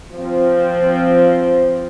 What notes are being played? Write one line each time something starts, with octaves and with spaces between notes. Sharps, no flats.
F3 C4